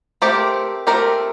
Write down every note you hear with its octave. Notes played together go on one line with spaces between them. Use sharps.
A3 C4 G4 A#4
A3 C4 G4 A#4